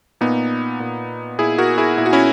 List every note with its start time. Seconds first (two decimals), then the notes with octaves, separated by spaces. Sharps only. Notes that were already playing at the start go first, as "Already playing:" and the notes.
0.21 A#2 B3 D#4
0.80 A#2
1.39 A#2 E4 G#4
1.58 F#4 A#4
1.78 E4 G#4
1.97 A#2 E4
2.06 F#4
2.13 C#4 E4